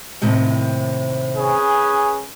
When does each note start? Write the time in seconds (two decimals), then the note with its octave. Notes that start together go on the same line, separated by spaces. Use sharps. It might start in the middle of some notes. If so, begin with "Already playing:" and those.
0.22 D#2 A2 C3
1.37 C#4 G#4 B4